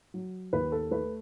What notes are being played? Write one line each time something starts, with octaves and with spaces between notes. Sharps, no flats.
F#3
D#2 B4
A4
A3 B4